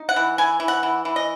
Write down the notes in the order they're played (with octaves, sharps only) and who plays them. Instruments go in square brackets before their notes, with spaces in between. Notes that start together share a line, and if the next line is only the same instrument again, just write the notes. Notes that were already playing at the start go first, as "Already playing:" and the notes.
Already playing: [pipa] D#4
F#5
E3
E3 G#5
E3
F#5
E3
E3
D#5